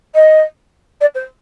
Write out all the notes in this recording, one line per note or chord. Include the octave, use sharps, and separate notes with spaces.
D#5
D5
C5